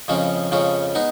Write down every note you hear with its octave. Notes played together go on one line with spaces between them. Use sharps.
F2 C#3 F3 G#3 C#4
F2 C#3 F3 G#3 C#4
G#3 B3 D#4